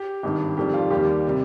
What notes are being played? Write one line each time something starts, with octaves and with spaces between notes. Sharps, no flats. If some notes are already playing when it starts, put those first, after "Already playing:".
Already playing: G4
G#1 G2 D#3
F2 D#3 G3 G4
F4
D#2 D#3 G3 G4
C3 G3